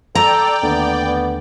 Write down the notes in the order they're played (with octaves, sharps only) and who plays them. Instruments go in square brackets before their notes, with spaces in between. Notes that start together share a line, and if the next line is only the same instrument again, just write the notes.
[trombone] A4 [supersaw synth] D5 G5 [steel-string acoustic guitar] A#5
[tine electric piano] D#2 D3 A3 [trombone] B3
[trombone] B3